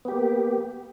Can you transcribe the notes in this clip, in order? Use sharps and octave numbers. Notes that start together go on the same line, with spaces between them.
A#3 B3 G4